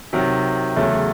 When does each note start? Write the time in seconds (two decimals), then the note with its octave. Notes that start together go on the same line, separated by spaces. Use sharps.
0.13 C3 D#3 F#3
0.76 E2 C#3 F#3 A3